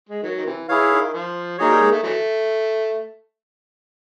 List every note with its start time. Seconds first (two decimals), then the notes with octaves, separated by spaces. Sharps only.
0.09 G#3
0.23 D#3 F#3
0.37 D#3
0.45 C3 E3
0.69 E3 E4 G#4 C#5 F5
0.91 D#3
1.14 F3
1.58 F#3 A#3 D#4 G#4 C#5
1.69 G3
1.81 G#3
1.92 A3
2.03 E3 F#3 A3